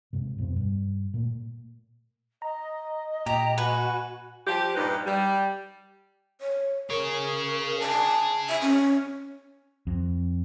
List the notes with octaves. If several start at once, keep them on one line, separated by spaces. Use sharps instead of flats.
G#2 C3
F2 B2 C4
G2
A#2 A3 A#3
D#5 A#5
A#2 G4 A#5
F#4 B4 G#5
F3 G4
G2 A#2 F3 D#4 B4
G3
C#5
G#4 A#4 C#5
A5
E5
C#4
F2